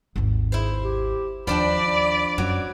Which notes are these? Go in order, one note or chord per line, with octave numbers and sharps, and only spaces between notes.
G#1 D#2
E4 G#4 C5
G4
D#2 F3 D4 D5 G5 B5
F#2 F#3